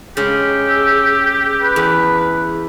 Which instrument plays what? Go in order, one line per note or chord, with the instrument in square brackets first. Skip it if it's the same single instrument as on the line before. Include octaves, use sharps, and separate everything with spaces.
[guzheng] C#3 G#3 [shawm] G4
[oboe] E6
B4
[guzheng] E2